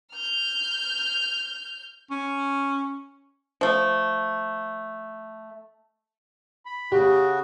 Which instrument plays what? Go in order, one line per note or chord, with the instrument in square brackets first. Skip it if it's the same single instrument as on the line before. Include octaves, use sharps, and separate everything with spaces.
[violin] F6 G6
[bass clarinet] C#4
[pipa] F3 A3
[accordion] B5
[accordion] C#3 F#4 [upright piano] G4